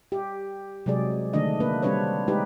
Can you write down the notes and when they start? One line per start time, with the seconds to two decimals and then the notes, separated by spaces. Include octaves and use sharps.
0.12 G4
0.86 C3 F#3 G#3 G#4 D5
1.33 D3 D#3 A3 D4 D#5
1.60 A#3 D4 B4
1.83 G3 C4 D4 B4 C#5
2.28 G#3 D#4 G4 B4